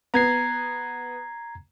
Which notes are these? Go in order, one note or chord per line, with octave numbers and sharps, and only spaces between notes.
B3 A#5 G#6 C7